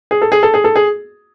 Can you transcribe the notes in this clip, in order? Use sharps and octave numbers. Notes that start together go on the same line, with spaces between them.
G#4
A4
G#4
A4
G#4
A4
G#4